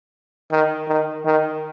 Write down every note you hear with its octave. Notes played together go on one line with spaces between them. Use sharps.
D#3
D#3
D#3